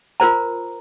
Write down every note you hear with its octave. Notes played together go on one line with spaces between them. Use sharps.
F4 A#4 C5 A#5